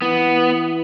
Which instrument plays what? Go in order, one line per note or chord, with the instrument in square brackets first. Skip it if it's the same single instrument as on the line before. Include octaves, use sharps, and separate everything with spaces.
[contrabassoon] E3 [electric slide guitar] B3